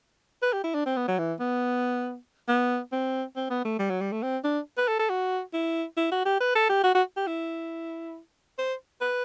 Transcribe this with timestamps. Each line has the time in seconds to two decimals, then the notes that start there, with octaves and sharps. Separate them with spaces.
0.42 B4
0.53 G4
0.64 E4
0.74 D4
0.86 C4
0.96 B3
1.08 F#3
1.18 E3
1.40 B3
2.48 B3
2.92 C4
3.36 C4
3.50 B3
3.65 A3
3.79 G3
3.90 F#3
4.01 G3
4.12 A3
4.22 C4
4.44 D4
4.77 B4
4.88 A4
4.99 A4
5.10 F#4
5.53 E4
5.97 E4
6.11 F#4
6.25 G4
6.40 B4
6.55 A4
6.69 G4
6.84 F#4
6.95 F#4
7.17 G4
7.27 E4
8.58 C5
9.01 B4